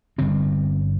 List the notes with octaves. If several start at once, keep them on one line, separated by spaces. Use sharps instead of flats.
G1 G2 D3 C4